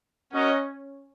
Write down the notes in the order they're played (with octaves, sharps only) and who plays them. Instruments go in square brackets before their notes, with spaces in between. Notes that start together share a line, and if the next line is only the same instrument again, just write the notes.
[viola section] C#4 [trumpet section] F#4 A#4 D#5 F#5